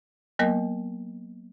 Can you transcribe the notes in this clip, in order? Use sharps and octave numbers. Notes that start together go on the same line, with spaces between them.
F#3 A#3 B3 A#4 D#5